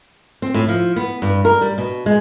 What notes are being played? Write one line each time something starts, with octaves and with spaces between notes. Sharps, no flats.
C4
A2
F3
B3
G2
A#4
G3
B2
G#3